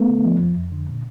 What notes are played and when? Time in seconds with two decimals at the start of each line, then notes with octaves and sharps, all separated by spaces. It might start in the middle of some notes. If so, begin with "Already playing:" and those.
Already playing: A3 B3
0.09 D3
0.24 F3
0.41 F2
0.56 F2
0.72 D3
0.89 A#2